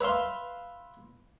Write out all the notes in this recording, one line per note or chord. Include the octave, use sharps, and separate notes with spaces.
B4 E5 F5 C6